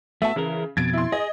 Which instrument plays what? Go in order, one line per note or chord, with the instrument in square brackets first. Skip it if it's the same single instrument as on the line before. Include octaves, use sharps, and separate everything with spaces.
[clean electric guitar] A3 B3 F#4 [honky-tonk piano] E5 A5
[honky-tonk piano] C#3 [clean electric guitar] E3 E4 A#4
[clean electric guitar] F2 B2 [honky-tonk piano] G#6 A6 D7
[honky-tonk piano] E4 C6
[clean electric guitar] G#4 [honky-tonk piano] D#5